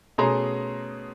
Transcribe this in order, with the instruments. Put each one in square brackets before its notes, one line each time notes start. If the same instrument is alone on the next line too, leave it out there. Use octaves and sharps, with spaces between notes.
[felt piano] B2 A3 C#4 G#4 A#5 C6